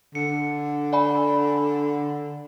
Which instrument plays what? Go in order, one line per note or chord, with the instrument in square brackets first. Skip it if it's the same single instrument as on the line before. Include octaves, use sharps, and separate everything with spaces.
[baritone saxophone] D3 [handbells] C#7
[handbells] D5 G#5 B5